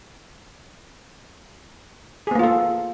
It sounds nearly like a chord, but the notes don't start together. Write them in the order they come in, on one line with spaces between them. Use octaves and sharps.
G#4 B3 A#3 F4 A4